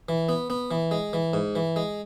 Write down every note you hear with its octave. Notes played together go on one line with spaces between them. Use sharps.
E3
B3
B3
E3
G#3
E3
G#2
E3
G#3